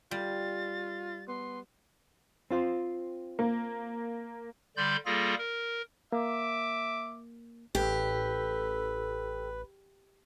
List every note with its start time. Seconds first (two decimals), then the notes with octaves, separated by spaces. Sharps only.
0.11 G3 F4 A6
1.28 B3 C6
2.51 C4 F4 C5
3.39 A#3
4.77 D3 G3 D5 B5 C6 G6
5.06 G3 A#3 F4 G#4 A4 A#6
5.38 A#4
6.12 A#3 E5 D6
7.75 A1 G4 A4 B4